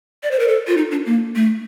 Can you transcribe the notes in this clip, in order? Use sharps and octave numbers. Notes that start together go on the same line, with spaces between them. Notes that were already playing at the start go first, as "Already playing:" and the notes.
D5
C5
A#4
A4
F4
D#4
D4
A#3
A3